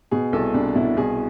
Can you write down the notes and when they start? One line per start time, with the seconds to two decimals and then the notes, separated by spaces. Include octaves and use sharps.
0.11 B2 G#4
0.33 C2 A4
0.54 C2 D4
0.75 B2 E4
0.96 C2 G#4